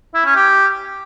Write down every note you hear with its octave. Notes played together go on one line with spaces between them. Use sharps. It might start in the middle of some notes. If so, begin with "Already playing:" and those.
E4
C#4
G4